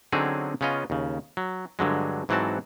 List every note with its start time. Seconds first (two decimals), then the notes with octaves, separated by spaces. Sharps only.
0.12 D3 F#3 C4 C#4 D#4 G#4
0.61 C#3 B3 C#4 F4 D#5
0.90 D#2 C#3
1.37 F#3
1.79 G2 D3 F#3 G#3
2.29 G#2 E3 F#3 C4 F#4 A5